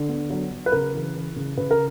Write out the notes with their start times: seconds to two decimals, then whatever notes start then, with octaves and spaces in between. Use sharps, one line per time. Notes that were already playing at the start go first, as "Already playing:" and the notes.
Already playing: D3
0.09 B3
0.30 F#3
0.51 F#3
0.66 B4
0.72 C#3 A#4
0.94 E3
1.15 E3
1.36 C#3
1.57 C#3 B4
1.71 A#4